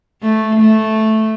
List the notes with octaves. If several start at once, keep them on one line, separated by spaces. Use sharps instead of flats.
A3
A3